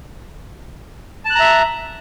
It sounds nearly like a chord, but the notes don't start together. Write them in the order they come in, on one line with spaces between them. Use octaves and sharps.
A5 F#6 A#5 E5